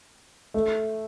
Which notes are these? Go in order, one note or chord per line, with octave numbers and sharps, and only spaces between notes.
A3